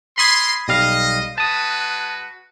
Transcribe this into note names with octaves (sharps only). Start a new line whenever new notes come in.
A#4 B5 C6 D#6 G#6
B1 G3 D#5 F5
G#3 F#4 B4 A5 D#6